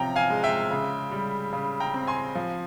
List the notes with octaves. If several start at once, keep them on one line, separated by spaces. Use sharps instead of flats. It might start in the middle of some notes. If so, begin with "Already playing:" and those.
Already playing: C3 F3 C#4 G5 A#5
F5 G#5
G#3
E5 G5
C#3
G3
C#3
G5 A#5
C4
G#5 C6
F3